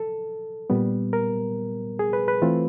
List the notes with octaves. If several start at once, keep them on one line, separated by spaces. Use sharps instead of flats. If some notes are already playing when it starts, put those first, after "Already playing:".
Already playing: A4
A#2 G3 B3
A#4
G#4
B4
B4
E3 A3 C4 F4